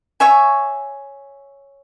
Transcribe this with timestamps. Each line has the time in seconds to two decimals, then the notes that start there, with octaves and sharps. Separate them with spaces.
0.20 C#5 E5 G#5 C#6